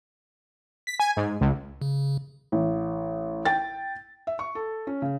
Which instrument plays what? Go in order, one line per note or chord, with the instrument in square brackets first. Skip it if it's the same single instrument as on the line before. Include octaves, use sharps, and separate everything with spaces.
[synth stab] B6
G#5
G#2
C#2
[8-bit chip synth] C#3
[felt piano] A1
G5 A6
E5
C#6
A4
C#4
C#3